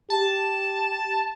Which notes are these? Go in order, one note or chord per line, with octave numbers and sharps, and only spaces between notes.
G4 A5